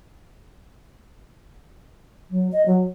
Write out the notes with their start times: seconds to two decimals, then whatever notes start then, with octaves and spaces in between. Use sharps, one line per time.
2.30 F#3
2.52 D#5
2.66 F#3